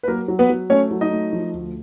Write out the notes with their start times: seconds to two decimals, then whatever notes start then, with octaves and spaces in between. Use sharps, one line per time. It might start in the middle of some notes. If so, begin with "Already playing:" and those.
0.03 B4
0.08 F#3 A#3 A#4
0.28 F#3
0.39 B3 B4
0.50 F#3
0.70 A3 C#4 C#5
0.91 F#3
1.01 D#4 D#5
1.11 A3
1.33 F3
1.53 D2